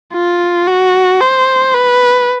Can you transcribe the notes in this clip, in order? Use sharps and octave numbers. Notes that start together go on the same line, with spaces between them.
F4
F#4
C5
B4